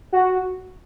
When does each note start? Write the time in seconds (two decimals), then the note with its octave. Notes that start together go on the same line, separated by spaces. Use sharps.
0.13 F#4